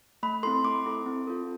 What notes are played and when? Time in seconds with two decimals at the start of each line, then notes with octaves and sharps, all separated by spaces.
0.23 A3 B5
0.43 C4 E4 A4 C6
0.64 A3 D6
0.86 C4 E4 A4
1.06 C4
1.27 F4 A4